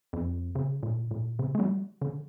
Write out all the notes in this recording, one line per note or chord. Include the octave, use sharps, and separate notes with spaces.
F2
C#3
A#2
A#2
C#3
A3
G3
D3